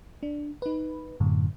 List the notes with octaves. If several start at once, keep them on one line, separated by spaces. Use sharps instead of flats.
D4
D#4 B4
F#2 A2 D3